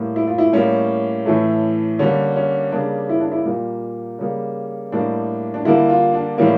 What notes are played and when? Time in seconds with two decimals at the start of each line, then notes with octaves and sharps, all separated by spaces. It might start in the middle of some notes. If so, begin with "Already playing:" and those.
Already playing: A2 G3 A#3
0.16 E4
0.27 F4
0.38 E4
0.53 A2 G3 A#3 C#4
1.26 A2 E3 A3
1.99 D3 G3 A#3 C#4
2.36 C#4
2.72 C#3 G3 A#3 D4
3.09 E4
3.20 D4
3.32 E4
3.45 A#2 G3 A#3
4.19 C#3 G3 A#3
4.92 A2 G3 A#3 D4
5.54 D4
5.65 D3 G3 A#3 E4
5.89 F4
6.14 D4
6.38 A2 E3 G3 A#3 C#4